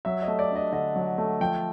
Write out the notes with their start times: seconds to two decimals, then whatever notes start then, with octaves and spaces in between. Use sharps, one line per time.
0.05 F#3 E5
0.22 D#5
0.27 A3
0.39 D5
0.51 D4 D#5
0.72 D3 D#5
0.96 F#3
1.18 A3
1.41 F3 G5